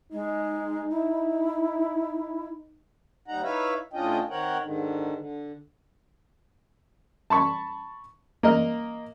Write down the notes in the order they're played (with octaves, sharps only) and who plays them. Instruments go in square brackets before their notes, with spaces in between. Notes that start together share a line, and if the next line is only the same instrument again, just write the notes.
[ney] G#3 [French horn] D#4
[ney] E4
[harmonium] D#2 G3 D#4 F#5 A#5
D#4 E4 B4 C#5 E5 F5
A2 C#4 D4 F4 D#5 G5
D#3 C4 A#4 C#5 F#5 G5
G#2 D3 D#3
D3
[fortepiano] A5 B5 C#6
A#3 D#5 F6